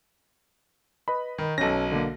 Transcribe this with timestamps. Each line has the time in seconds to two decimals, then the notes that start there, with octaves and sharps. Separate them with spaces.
1.08 B4 D#5 B5
1.38 D#3
1.58 B1 C#4 A4 A#6
1.92 D3 A#3